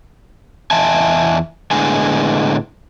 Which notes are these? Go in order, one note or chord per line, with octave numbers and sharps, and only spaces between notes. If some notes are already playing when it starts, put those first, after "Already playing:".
E2 D#5 E5 G#5 A5
A2 D3 G#3 B3 G#5